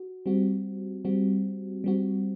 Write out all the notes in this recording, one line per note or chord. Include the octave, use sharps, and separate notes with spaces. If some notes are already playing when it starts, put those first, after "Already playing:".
Already playing: F#4
G3 C4 F#4
G3 C4 F#4
G3 C4 F#4